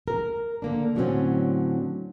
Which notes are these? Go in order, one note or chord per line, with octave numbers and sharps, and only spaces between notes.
A#4
D3 A#3 D4
A2 D3 F#3 G3 C4 C#4